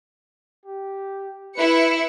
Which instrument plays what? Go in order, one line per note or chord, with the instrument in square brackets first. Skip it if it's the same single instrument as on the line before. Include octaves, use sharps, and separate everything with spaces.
[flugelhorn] G4
[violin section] E4 C#7 [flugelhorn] B4